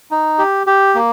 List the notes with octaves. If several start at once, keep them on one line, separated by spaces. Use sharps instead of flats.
D#4
G4
G4
A#3